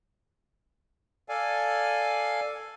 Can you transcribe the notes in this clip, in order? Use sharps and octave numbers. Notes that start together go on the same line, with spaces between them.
A4 D5 F5 G#5